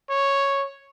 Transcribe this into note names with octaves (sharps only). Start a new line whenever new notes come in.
C#5